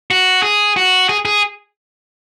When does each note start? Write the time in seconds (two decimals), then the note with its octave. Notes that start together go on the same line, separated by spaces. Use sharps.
0.11 F#4
0.43 G#4
0.76 F#4
1.09 G#4
1.25 G#4